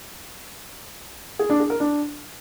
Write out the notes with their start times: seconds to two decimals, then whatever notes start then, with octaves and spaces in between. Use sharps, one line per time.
1.39 G#4
1.50 D4
1.60 G#4
1.70 A#4
1.80 D4